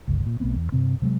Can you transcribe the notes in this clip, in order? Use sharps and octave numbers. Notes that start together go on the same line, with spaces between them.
G1 C#2
A#2
B1 A3 B3 C4
E2
G2 C3 C4
C3 F#3 G#3